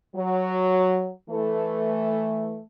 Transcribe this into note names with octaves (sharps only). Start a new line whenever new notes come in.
F#3
E3 A3